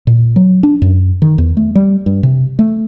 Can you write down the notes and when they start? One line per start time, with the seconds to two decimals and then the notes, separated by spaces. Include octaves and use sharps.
0.07 A#2
0.36 F#3
0.63 D4
0.82 F#2
1.22 D#3
1.38 E2
1.57 A3
1.75 G3
2.06 G2
2.23 C3
2.59 A3